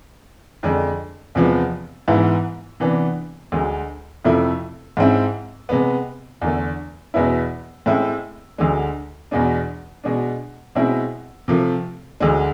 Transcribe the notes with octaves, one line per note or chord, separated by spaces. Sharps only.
F2 D3 G#3 D4
E2 C3 F3 G#3 B3
G#2 E3 B3 E4
C3 E3 B3 D4
D2 D3 G#3
F2 C3 F3 A3 E4
G#2 G#3 C4 E4
C3 G#3 B3
E2 D3 A3
E2 B2 G#3 B3 E4
A2 G#3 C4 E4
D2 D3 G#3
E2 B2 G#3 D4
B2 G#3 D4
B2 G#3 C4 E4
C3 F3 A3
D2 D3 G#3